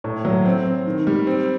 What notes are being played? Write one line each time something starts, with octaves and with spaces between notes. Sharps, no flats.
A2
F#3
C4
C4
D#3
G3
C4